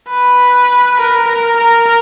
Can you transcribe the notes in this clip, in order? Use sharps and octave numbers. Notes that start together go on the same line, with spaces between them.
B4
A#4
A#4
A#4